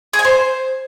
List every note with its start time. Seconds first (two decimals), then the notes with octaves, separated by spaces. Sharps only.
0.13 G#4
0.19 G#5
0.25 C5